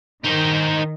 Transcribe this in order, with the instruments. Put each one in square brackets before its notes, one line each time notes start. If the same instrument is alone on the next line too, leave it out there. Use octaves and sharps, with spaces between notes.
[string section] D#3 [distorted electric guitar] D#4 C5